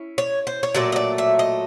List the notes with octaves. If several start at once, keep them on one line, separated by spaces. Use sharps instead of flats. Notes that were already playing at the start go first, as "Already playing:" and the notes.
Already playing: C#4 E4
C#5
C5
C#5
A#2 F#3 A3 D5
D#5
D5
E5
D#5